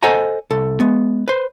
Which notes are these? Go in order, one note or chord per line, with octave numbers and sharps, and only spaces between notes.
A4 C5 D#5 F#5 G#5 A#5
C2 A4
G#3 B3
B4 C5